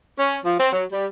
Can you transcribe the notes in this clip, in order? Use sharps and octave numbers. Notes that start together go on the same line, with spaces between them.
C#4
F3
C4
F#3
G3